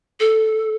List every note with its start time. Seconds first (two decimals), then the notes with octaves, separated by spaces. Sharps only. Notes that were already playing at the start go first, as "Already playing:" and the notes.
0.20 A4